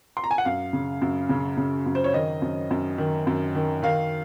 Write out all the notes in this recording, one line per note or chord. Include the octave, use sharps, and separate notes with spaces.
C6
A#5
G#5
F#5
F#2 F5
C#3
F#2
C#3
C#3
F#2
C5
C#5
D#3 D#5
F#2
F#2
D#3
F#2
D#3
D#3 F5